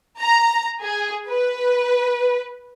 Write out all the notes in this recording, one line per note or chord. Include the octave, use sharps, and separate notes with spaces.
A#5
G#4
B4